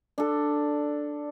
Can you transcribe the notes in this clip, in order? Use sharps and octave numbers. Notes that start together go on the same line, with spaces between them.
D4 A4